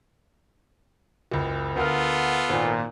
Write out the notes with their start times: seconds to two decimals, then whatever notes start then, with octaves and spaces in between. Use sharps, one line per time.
1.32 F#1 C#2
1.76 D2 B3 F4 A4 A#4 F6
2.50 G#1 A#2